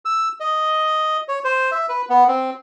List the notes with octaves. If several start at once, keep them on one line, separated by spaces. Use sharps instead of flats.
E6
D#5
C#5
C5
E5
B4
B3
C4